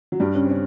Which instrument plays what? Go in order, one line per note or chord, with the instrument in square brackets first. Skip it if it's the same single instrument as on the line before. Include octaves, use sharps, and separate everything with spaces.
[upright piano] F#3
G2 G3
C#3 C#4
C4
C#3 C#4